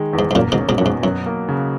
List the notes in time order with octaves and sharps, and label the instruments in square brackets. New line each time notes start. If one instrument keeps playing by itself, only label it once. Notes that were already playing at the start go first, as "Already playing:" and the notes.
Already playing: [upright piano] D#3 G#3
E2
[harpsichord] G#2
G#2
[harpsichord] F#2 A#2 [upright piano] A#3
[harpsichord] G#2 B2
[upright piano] C#4
[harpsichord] G#2 B2
F#2
[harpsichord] G#2 [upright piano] B2
[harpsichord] F#2 [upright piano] F#3
[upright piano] A#3
C#3